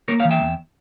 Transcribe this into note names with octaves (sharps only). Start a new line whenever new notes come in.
A#3 A#4 C#5
C#5 F5
E3
E5 G5
E2